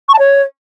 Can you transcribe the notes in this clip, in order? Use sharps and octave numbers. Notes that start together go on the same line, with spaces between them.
C#6
A5
C#5